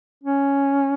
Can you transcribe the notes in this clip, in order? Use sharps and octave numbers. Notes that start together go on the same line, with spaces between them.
C#4